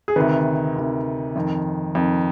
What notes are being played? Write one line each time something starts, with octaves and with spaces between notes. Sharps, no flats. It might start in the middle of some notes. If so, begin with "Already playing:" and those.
G#4
D2 C3 D#3 B4
D2 C3 D#3
F2 D#3
F2 D#3